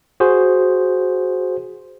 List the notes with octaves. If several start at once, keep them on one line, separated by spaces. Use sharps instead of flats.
F#4 G#4 C5